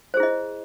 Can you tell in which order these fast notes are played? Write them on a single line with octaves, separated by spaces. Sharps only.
C5 G#4 E4 D#5